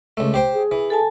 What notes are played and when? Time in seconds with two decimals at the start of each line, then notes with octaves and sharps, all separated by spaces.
0.17 C#2 A3
0.34 G4 C5 G5
0.54 G#4
0.71 E3
0.90 A4 G#5 A5